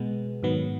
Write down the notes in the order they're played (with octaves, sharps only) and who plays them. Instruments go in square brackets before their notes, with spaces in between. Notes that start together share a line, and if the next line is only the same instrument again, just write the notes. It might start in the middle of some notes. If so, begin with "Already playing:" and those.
Already playing: [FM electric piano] B2 G#3 B3
G#2 D#3 F#3 B3